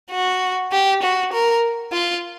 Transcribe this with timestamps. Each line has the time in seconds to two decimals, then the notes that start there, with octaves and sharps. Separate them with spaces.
0.11 F#4
0.72 G4
1.02 F#4
1.33 A#4
1.92 F4